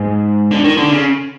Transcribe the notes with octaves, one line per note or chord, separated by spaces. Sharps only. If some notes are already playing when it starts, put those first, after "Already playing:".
Already playing: G#2
D3
D#3
D3
C#3